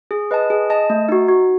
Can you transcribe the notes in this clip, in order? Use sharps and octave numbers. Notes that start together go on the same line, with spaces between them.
G#4
B4 D#5 A5
G#4
D#5 A5
A3
D#4 F#4
F#4